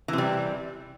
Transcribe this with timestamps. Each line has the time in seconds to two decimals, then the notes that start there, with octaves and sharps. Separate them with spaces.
0.08 E3
0.13 C3
0.18 G3